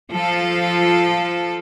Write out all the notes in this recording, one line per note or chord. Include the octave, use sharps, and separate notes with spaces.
F3 A4